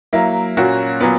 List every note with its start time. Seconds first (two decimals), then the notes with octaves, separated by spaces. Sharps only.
0.13 F#3 A#3 E4
0.57 A#2 A#3 C#4 F#4
1.00 A#2 F#3 B3